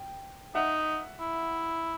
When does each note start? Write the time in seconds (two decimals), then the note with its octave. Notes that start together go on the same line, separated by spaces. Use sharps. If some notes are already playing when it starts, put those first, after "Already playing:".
Already playing: G5
0.55 D#4 E5 F#5
1.20 E4